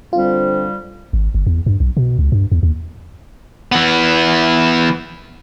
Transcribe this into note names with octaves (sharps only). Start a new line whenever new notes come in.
D3 G3 C4 F4
G#1
G1
E2
G2
B1
B2
C#2
G2
E2
D#2
E3 B3